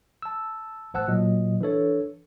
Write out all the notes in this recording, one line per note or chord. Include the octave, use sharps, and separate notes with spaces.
A5 E6
A1 C5 F#5 A5 E6 F#6
A#2 F#3 A#3 D#5
E3 D4 A4 C#5